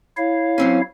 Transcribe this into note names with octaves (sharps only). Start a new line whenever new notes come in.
E4 C#5 F5
F#3 C4 C#4